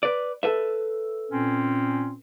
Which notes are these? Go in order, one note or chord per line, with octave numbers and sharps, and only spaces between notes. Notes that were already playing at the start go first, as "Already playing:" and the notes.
B4 D5
A4 B4 E5
A#2 C4 C#4